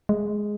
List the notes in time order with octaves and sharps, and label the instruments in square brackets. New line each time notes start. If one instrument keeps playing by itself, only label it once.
[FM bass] G#3